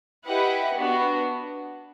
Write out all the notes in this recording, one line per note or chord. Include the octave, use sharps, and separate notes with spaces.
E4 G4 B4 D#5 F#5
B3 D4 F#4